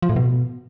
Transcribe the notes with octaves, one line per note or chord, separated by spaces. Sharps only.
F3
A2
B2